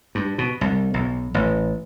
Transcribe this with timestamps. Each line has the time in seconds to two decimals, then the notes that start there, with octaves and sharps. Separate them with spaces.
0.15 G2
0.38 B2
0.61 C2
0.94 B1
1.34 A1